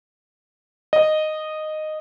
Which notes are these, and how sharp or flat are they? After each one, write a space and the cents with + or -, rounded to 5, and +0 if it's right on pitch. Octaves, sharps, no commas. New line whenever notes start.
D#5 -10